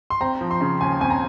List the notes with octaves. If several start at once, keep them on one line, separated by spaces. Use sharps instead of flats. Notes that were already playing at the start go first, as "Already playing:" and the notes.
C6
C4 A#5
F3
C6
C#3
D#2 G#5
C4 G#5
A#5